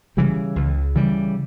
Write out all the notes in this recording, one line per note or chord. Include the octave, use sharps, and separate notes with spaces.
C#3 E3 G3
C#2
C#3 E3 G3